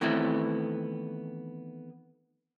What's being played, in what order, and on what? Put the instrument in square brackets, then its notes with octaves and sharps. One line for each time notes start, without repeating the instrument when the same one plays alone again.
[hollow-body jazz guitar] D#3 E3 A3 B3 C4 E4